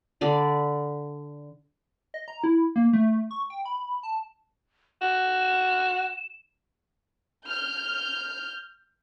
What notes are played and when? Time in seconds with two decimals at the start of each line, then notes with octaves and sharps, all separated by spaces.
0.21 D3 D5 B5
2.14 D#5
2.28 A#5
2.44 E4
2.76 A#3
2.93 A3
3.31 C#6
3.50 G5
3.66 B5
4.03 A5
5.01 F#4 E7
7.47 F6 G6